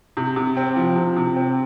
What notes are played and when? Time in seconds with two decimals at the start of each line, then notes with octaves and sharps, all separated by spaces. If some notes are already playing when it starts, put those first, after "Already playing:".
0.17 C3
0.36 C3
0.57 C4
0.76 F3
0.96 C3
1.17 C3
1.36 C4